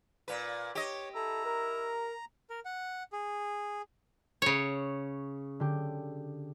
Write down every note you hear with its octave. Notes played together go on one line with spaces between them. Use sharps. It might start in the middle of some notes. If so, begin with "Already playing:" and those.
A#2 B4
G4 C#5 D#5
E4 A4 A#5
A#4
A#4
F#5
G#4
C#3 C#5
D3 G4